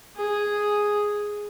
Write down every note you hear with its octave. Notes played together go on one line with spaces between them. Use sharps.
G#4